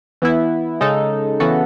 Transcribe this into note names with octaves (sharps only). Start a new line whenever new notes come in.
E3 B3 E4
C#3 G#3 D#4 A4
C#3 E3 B3 F#4 A4